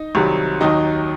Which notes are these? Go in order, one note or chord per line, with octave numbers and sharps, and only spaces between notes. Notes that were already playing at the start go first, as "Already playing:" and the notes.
Already playing: D#4 D#5
C2 C3 D#3 F#3
D#2 D#3 F#3 D#4 D#5